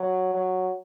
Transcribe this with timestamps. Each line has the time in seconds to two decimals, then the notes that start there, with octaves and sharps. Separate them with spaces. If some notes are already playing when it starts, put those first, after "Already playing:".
Already playing: F#3
0.34 F#3